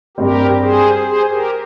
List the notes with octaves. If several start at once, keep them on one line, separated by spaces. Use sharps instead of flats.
G2 G3 C4 G4 A#4
G#4 C5
G#4 C5
G4 A#4